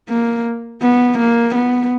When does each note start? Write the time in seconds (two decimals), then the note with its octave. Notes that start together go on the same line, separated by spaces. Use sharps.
0.09 A#3
0.82 B3
1.19 A#3
1.55 B3